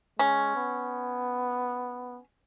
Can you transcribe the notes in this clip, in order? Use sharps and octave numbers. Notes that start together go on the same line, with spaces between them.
G#3 C#4
B3